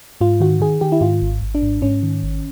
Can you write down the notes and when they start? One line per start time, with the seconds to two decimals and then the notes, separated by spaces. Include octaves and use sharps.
0.21 G#2 F4
0.40 D#3 F#4
0.60 D#3 G#4
0.81 D#3 G4
0.92 E4
1.01 G#2 F4
1.22 G#1
1.42 G#1
1.55 D4
1.62 G#2
1.82 G#2 C#4
2.03 D#3
2.23 G#1